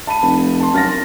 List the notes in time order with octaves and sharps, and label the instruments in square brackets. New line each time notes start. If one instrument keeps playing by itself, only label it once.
[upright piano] A5 B5 D#7
[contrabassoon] F1
[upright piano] A5 C6
[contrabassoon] F#2 [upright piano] F6 A6 A#6